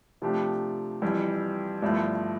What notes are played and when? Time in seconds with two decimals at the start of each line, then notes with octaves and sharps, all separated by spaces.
0.22 C3 F3 A3 D4 G4
1.02 F2 E3 G3
1.82 G1 G2 F3 A3 E4